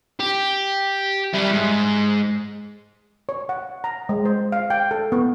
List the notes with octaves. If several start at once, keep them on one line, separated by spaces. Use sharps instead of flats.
G4
G3 E4
G#2
C#5
F#5
A#5
G#3
C5
F5
G5
A4
B3